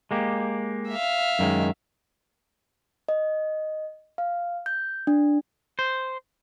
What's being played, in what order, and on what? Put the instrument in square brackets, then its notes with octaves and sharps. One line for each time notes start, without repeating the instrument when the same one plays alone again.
[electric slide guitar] G#3 A#3 G4
[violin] E5 F5
[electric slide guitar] F#2 D#3 G#3
[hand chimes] D#5
F5
G6
D4
[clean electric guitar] C5